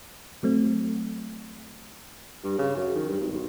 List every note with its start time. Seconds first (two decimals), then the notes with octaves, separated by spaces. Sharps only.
0.43 F#3 A3 C4
2.44 G2
2.58 C#3
2.76 F#2
2.95 D#3
3.08 G2
3.20 G#1
3.32 B1